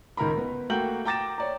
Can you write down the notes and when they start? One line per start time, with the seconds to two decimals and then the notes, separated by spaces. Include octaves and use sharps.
0.17 C#2 D#3 A#4 A#5 B5
0.37 B3
0.70 A3 A#3 F#4 G5 G6 F#7
1.05 G5 A#5 D6 A6 A#6 E7
1.38 C#5 D5 A#5